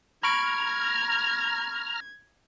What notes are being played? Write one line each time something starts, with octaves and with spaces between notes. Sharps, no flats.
A#5 B5 C#6 F6 G#6 D7